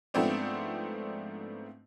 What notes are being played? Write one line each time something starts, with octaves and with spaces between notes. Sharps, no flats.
G#2 F3 A3 B3 C4 D4